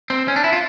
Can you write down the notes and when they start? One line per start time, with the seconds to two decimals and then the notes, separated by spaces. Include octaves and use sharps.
0.10 C4
0.28 C#4
0.36 D4
0.44 E4
0.53 F4